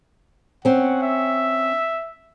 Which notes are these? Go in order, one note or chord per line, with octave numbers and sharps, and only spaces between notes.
C4 C#4 F#5
E5